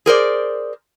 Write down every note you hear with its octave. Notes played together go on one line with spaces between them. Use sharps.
G#4 A#4 C5 D5